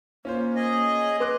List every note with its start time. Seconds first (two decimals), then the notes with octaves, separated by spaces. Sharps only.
0.25 A#3 C#4 F4 C5
0.56 G#4 D#5
1.20 B4 C6 D6 F#6